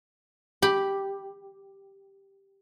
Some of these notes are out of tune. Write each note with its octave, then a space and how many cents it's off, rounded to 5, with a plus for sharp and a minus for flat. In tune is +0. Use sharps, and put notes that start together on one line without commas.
G4 +0 B5 +0